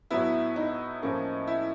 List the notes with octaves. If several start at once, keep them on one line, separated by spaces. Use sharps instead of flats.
A2 F#3 B3 E4
D#4
A2 F3 A#3 C#4
E4